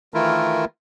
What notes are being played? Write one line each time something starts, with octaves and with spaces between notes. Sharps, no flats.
D#3 E3 A3 E4 F4 A#4